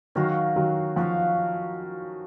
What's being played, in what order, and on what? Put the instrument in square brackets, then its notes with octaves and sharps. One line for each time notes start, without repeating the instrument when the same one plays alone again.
[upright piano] D#3 F#3 [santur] C#4 F#4 A#4 F5
[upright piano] D#3 F#3
[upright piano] F3 [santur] C#4 F#4 A#4 F5